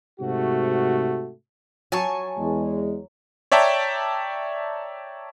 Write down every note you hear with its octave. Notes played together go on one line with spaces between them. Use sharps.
G#2 C3 A3 F#4
F#3 G#5 A5 C#6
E2 G#3
C#5 D5 E5 G5 A5 A#5